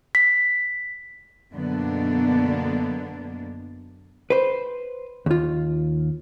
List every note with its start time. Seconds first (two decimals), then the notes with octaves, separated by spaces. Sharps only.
0.15 B6
1.53 F#2 B2 D3 A#3 B3 D4
4.30 B4 C5
5.26 D#2 F4